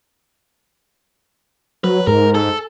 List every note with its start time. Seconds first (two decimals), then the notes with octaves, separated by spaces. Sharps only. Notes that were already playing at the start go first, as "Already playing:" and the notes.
1.84 F#3 B4
2.07 G#2 A#4
2.35 A4